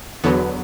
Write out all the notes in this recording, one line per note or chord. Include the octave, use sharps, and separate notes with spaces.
E2 D3 F#3 B3